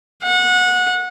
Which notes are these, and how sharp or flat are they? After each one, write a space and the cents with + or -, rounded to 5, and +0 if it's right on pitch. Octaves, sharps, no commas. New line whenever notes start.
F#5 -25